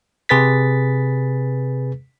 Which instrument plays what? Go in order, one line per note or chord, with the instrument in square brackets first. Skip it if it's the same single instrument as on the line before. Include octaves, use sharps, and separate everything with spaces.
[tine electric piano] C3 G#4 B4 A6 B6